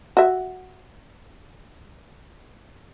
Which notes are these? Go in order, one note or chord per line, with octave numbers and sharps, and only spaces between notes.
F#4 E5